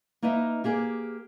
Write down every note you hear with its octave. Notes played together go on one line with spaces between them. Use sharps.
A#3 D#4 B4 D#5 E5
A#3 G4 G#4 A#4